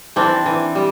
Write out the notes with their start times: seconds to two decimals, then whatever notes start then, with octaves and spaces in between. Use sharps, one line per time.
0.16 E3 C4 D4
0.46 E3
0.75 G3